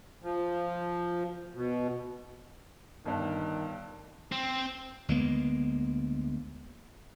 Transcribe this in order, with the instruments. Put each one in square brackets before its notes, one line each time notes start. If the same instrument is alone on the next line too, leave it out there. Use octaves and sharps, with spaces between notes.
[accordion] F3
B2
[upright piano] G1 G2 [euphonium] D#3
[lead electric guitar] C4
[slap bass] D2 G#3 A#3 B3